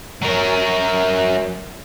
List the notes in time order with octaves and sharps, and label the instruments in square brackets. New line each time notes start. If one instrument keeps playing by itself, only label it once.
[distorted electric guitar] F#3 A#4